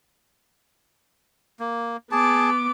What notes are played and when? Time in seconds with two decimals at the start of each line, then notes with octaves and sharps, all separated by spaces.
1.60 A#3
2.12 B3 G#4 A5 D6